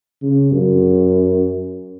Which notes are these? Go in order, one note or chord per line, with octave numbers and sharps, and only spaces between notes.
C#3
F#2